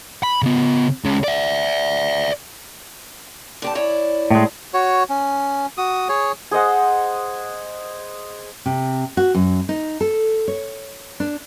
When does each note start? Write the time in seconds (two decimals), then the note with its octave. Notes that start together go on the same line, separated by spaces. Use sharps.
0.23 B5
0.42 C#3 B3
1.04 C#2 C#3
1.24 D5 E5
3.62 D3 G4 A5
3.75 E4 C#5 D5
4.30 A2 G#3
4.74 F#4 C#5
5.09 C#4
5.78 F#4 D#6
6.09 G#4 C#5
6.51 G#4 C5 D#5 F#5
8.66 C3
9.17 F#4
9.35 F#2
9.69 D#4
10.01 A4
10.48 C#5
11.20 D4